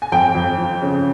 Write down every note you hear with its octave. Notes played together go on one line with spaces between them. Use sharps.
G#5
F2 G5
F2
F3
C#3